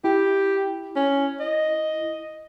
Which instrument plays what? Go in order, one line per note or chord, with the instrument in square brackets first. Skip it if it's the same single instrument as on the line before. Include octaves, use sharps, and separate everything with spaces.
[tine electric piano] E4 [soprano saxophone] G4
[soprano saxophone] C#4
D#5